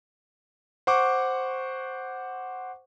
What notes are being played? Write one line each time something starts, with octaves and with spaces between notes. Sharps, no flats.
C5 F#5 C#6 D6